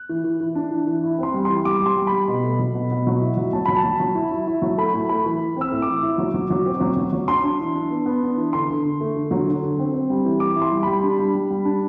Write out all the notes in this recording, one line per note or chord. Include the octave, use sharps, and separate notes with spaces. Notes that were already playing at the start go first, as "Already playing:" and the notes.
Already playing: F#6
E3
E3
E3
D4
E3
E3
E4
C4 C6
G3
E3 C6
G3 D6
G3
C6
G3
G3 B5
B2
A3
F#3
B2
B2
F#3
E4
F#3
F#3 A5
F#3 B5
A5
F#3
F#3
E4
E4
E4
F#3
A3 B5
A2
A3 B5
E3
E3
C4 E6
A2
D6
E3
E4
F#3
F#3
F#3
C4
F#3
F#3
F#3
D4 C6
D4
E3
D4
B3
B3
D4
E3
D3 C6
D3
D3
A3
D3
F#3
D3
D3
C4
C4
G3
E3
E3 D6
E4
C6
G3
G3 B5
D4
G3
G3
G3
D4